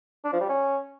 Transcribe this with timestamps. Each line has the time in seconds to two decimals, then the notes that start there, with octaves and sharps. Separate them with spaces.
0.24 D4
0.33 F3
0.41 G3
0.49 C#4